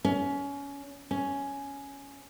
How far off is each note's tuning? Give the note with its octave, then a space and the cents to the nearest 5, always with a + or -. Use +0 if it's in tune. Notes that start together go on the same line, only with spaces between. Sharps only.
C#4 +25
C#4 +5